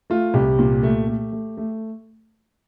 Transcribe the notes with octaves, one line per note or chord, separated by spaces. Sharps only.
A3 F4
C2 G4
A#2
A3
A3
A3
A3